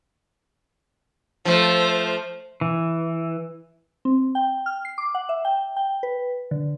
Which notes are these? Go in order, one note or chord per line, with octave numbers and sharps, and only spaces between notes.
F3 A3 C5
E3
C4
G5
F6
C7
D6
F#5
E5
G5
G5
B4
D3